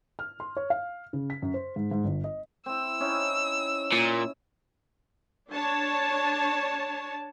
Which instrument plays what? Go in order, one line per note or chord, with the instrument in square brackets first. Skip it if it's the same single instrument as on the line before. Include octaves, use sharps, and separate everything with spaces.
[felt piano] F6
C6
C#5
F5
C#3
B6
F#2
C5
G#2
G#2
G1
D#5
[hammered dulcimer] C4 E4 [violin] E6
[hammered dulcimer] C#4 D#4 E4
[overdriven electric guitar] A#2
[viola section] D4 C#5 A5